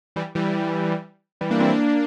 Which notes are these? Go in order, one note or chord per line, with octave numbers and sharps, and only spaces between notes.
E3 G3
E3 G3
E3 G3
A#3 D4
C4 E4
A#3 D4